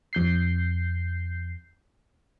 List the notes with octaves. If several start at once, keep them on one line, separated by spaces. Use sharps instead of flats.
F2 G6 C7